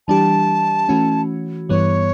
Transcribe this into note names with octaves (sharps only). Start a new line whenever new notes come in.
E3 G3 D4 G4 A5
E3 A3 C#4 F#4
G2 E3 G3 B3 C#5